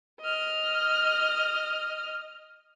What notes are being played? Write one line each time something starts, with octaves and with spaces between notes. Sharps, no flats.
D#5 F6